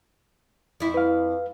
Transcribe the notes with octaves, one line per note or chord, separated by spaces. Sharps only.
F2 E4
B4 F5